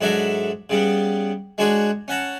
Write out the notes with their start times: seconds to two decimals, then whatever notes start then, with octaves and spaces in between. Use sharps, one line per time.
0.01 G#2 F#3 D4 A4 E5 A#5
0.70 C#3 G3 B3
1.58 G#3 D4 F#4 G#4 C#5
2.08 C#4 F#5 A5 A#5